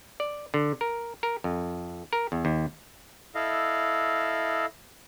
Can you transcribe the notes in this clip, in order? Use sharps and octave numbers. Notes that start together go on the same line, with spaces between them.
D5
D3
A#4
A#4
F2
A#4
E2
D#2
E4 A4 D#5 F5